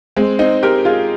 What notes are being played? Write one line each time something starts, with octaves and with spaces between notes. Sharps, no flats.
G#3 C4
C4 D#4
G4 A#4
F4 G#4